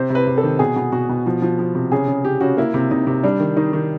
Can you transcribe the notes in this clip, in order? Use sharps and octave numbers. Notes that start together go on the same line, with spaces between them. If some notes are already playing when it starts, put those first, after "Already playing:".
Already playing: C3 C5
C3 B4
C3
A4
D#3
B2 G#4
B2
B2 F#4
B2
F3
F3
F3
C3
C#3 G#4
C#3
C#3 G4
C#3 F#4
A#3 E4
C3
C3 D#4
C3
G3 D4
D#3
D#3 D#4
D#3